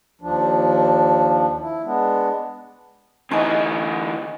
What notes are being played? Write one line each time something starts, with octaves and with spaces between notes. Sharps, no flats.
D#2 F3 D4
E4
G#3 B3 D4
D2 E3 D#4 G#5 C#6